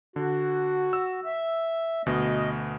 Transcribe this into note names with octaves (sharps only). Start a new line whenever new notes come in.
D3 F#4
E6
E5
D2 B2 D#5